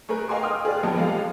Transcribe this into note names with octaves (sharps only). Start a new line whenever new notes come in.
A3 G#4 A#4 B4
D#5 F5 G5 G#5 C6 D6
G5 D#6 F6
G#4 B4 D5
A#1 F2 B3 G4 A5
A1 G#3 A4 F5